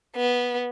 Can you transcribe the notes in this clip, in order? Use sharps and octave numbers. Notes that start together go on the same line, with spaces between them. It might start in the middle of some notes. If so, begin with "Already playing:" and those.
B3